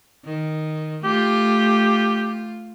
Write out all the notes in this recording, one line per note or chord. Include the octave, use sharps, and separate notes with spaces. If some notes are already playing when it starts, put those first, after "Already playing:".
D#3
A3 F4 G4